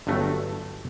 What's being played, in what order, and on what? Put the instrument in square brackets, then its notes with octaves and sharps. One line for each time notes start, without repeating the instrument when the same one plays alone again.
[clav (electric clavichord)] G1 G2 F#3 A3